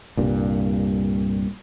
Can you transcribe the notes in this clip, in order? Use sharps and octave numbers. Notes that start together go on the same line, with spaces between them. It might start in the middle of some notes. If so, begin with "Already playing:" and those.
C2 G2 A#2